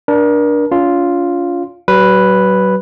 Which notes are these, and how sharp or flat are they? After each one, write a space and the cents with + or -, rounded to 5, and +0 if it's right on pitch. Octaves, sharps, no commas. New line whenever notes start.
D4 +0 A#4 +35
C#4 +45 F4 +0
F#3 +40 B4 +0